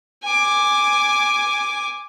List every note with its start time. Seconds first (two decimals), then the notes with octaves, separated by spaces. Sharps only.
0.24 G#5 D6